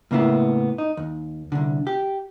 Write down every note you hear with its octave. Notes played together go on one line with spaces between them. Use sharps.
A2 C#3 A#3 B3 E4
D#4
D#2
C2 D3
G4